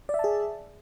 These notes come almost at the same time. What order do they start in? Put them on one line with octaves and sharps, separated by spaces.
D5 E5 A5 G#4